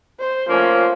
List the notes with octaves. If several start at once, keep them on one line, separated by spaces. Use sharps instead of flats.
C5
F3 A3 A#3 C#4